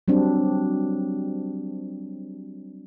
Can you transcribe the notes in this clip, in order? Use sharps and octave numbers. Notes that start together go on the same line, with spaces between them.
F#3 G3 C4 D4